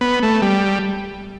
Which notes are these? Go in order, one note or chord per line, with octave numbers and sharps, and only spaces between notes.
B3
A3
G3